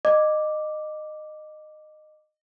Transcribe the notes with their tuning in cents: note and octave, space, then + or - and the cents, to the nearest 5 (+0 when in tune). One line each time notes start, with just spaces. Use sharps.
D#5 -20 D6 +0